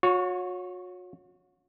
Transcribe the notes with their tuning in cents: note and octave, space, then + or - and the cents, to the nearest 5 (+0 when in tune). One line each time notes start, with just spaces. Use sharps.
F#4 -40 C#5 +0